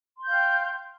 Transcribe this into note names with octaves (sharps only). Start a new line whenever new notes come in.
F5 G5 C6 G6